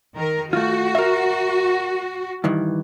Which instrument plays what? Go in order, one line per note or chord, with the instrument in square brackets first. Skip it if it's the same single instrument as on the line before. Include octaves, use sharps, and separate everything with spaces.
[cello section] D#3 A#4
[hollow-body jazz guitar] A3 F4 [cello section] F#4
[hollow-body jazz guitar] A#4 E5
G2 D#3 E3